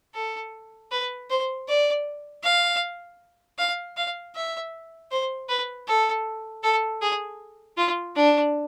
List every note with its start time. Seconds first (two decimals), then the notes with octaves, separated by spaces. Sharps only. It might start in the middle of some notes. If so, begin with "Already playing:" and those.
0.15 A4
0.91 B4
1.30 C5
1.68 D5
2.43 F5
3.59 F5
3.97 F5
4.35 E5
5.11 C5
5.49 B4
5.88 A4
6.63 A4
7.01 G#4
7.77 F4
8.16 D4